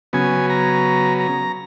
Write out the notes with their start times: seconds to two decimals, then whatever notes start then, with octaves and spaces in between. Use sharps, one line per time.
0.13 C#3 F#3 B3 G#5
0.50 A#5
1.20 A#5